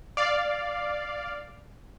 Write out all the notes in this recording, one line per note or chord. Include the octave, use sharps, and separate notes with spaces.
D5 F5